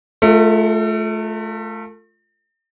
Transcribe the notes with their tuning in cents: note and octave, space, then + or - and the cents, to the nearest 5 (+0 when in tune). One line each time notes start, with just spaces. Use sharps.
A3 -25 F4 +0 A4 +40